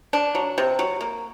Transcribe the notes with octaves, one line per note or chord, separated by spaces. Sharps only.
D4
F#3
C3
F#3
A#3